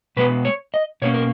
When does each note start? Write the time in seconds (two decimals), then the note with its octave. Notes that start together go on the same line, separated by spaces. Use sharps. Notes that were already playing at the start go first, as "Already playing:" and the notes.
0.17 B2 G#3 B3 B4
0.45 C#5
0.74 D#5
1.02 B2 A#3 C#4 C#5
1.14 A#4